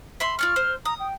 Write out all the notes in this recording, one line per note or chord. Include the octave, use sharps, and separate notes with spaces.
E5 B5 C6
F4 D5 C#6 F6
C5
A#5 D#6
G5